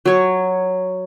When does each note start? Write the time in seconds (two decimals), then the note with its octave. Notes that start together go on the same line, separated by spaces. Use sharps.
0.05 F#3 C#5